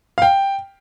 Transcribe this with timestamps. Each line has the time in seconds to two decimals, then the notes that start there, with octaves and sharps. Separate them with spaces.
0.18 F5
0.22 G5